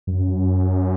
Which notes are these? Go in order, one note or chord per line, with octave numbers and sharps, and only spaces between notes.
F#2